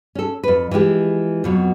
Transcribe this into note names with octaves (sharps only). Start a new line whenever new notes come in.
C#4 A4
F2 B4
E3 F3 G#3 G4
F2 B2 F#3